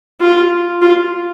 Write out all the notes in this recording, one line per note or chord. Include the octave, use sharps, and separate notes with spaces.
F4
F4